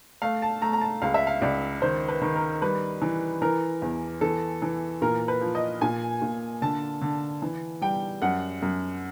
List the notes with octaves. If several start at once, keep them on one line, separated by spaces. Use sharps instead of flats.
A3 F5
A5
A3 A#5
A#5
A5
C#2 F5
E5
F5
C#2 D5
D#3 C5
B4
D#3
A#4
G3 B4
E3
E3 A#4
E2
E3 A4
E3
A#2 A#4
B4
F3
D#5
A#2 G#5
A#2
D3 A5
D3
E3
G3 G5
F#2 F#5
F#2